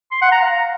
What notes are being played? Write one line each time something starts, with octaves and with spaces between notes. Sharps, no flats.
C6
F#5
A#5
F5